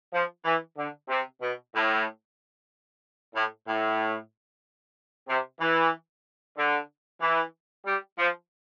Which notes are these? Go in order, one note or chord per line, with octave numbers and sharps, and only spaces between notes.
F3
E3
D3
C3
B2
A2
A2
A2
C3
E3
D3
E3
G3
F3